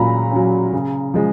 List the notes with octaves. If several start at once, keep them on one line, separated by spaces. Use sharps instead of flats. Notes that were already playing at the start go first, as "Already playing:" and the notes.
Already playing: A#2 F#3 C#4 A#5 B5
F#3 C#4
C#3
F3 G#3